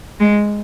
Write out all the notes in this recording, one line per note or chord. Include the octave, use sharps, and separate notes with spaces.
G#3